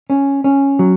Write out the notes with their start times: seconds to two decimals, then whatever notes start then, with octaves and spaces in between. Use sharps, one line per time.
0.10 C#4
0.44 C#4
0.79 F#3